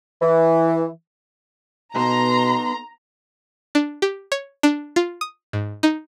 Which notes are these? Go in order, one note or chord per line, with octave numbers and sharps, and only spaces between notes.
E3
B2 B3 D#4 A4 A#5 C6
D4
G4
C#5
D4
F4
D#6
G#2
D#4